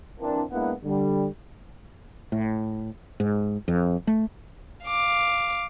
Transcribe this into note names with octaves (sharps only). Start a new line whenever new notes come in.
E3 A#3 C4 D4
G#3 A#3 B3 D4 E4 F#5
D3 G3
A2
G#2
F2
A3
F5 D6